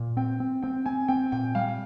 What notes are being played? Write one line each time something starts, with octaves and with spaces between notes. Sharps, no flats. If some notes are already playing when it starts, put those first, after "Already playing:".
Already playing: A#2
C4 G5
C4
C4 G5
C4 G#5
C4 G5
A#2 G5
G3 F5